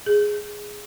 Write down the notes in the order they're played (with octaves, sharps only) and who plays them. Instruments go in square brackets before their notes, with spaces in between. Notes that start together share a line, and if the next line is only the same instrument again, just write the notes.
[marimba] G#4